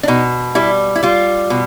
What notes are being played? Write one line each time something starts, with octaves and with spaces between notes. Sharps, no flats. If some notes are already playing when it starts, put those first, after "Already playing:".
D4
B2 D#4
G3 E4
E4
G3 F4
B2